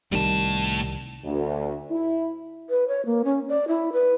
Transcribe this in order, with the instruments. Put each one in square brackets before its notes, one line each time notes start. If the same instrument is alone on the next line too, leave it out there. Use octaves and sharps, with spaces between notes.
[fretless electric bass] C2 D#3 G3 [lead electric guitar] A2 A5
[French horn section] D2
E4
[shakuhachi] B4
C#5
A#3
C#4
D5
E4
B4